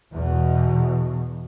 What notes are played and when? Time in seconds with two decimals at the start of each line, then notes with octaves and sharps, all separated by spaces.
0.12 E2 B2